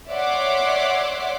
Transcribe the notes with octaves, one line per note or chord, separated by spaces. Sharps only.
C#5 D5 E5 F#5 C6 D6